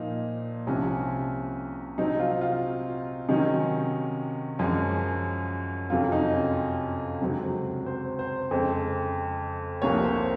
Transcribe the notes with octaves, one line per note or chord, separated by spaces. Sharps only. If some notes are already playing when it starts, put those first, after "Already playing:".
Already playing: A#2 F3 A#3 D#4
C2 C3 F3 C#4
C3 F#3 C4 D#4
F4
F4
C3 D#3 F#3 C#4 D#4
F#2 F3 G#3 C#4
F2 C3 F#3 C#4 F4
D#4
C#4
C#2 C3 F#3 C4
C5
C5
F2 C#3 G#3 C4
C2 C3 F3 A#3 C#5
C5